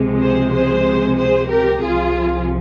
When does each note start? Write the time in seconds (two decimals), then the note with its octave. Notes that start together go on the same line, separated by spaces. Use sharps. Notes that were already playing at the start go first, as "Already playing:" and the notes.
Already playing: C#2 C3 F3 G#3
0.21 G#4 C5
0.54 G#4 C5
1.18 G#4 C5
1.50 G4 A#4
1.82 C2 C3 F3 F4 G#4